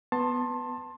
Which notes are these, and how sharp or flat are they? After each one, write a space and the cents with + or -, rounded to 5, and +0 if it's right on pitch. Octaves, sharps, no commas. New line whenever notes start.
B3 +0 A5 +15 C6 +25